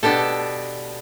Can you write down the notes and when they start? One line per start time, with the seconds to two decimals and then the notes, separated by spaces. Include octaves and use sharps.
0.03 B2 B3 D4 G4 A4